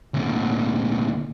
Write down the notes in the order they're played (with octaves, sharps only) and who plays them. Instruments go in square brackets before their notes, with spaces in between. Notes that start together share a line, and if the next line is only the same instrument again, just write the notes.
[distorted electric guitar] D2 A#2